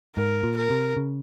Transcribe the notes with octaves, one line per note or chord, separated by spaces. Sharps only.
G#2 A#4
A#2
A#4
C3
C#3